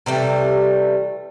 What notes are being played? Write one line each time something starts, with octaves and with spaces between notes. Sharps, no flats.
C3 E3 G3 A3